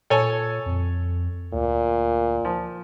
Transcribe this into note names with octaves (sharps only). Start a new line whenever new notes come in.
A#2 A4 C#5 G#5
F2
D2 A#2
F3